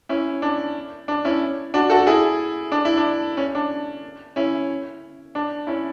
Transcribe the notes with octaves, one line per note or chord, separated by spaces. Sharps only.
C#4 E4
D4
D4
C#4 E4
D4 F#4
F#4 A4
E4 G#4
D4
E4
D4
C#4
D4
C#4 E4
D4
C#4 E4